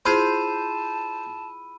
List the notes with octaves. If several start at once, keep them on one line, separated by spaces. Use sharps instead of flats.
E4 F4 G#4 C5 A5 B5 E6 D#7